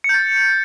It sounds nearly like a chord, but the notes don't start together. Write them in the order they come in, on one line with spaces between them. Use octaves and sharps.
C#7 G6 A6